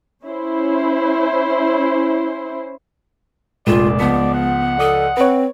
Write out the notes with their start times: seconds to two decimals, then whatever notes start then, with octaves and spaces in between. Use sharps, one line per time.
0.25 C#4 E4 C5
3.67 F1 A#1 G#3 F4 D5 E7
4.00 C#2 F3 B3 B6
4.34 F#5
4.79 A4 D5 D#6
5.17 C4 B4 C#5